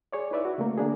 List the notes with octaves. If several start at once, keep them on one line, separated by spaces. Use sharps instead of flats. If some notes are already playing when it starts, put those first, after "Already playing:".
G#4 C#5 D5
D#4 E4 B4 D5 E5
F#4
C#3 A3 A#3
D3 A#3 D4 G#4